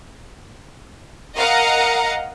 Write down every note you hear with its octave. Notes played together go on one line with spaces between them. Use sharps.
A#4 D#5 F5 F#5 A#5